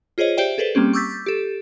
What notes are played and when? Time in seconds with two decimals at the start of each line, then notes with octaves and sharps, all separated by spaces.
0.18 F4 G#4 C5 C#5 D#5
0.38 G4 C5 D5 E5 G5
0.58 G#4 A4 B4 C5 D5
0.75 G3 A#3 C4 C#4 G4
0.93 C#6 D6 E6 G6 A6 B6
1.26 G4 A4